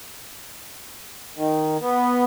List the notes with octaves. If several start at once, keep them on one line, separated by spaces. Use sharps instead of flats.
D#3
B3